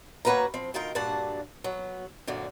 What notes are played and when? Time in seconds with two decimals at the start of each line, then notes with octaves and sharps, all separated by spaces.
0.25 A#3 C#4 F#4 B4 F5 A#5
0.54 F3 C4
0.74 D2 D#3 F4 A#4 G5
0.95 G2 A#2 D4 F#4 F#5 A5
1.64 F#3 B3
2.27 F#2 A#2 D3 C4